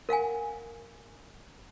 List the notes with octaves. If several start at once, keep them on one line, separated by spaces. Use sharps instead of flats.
A#4 F5 F#5 G#5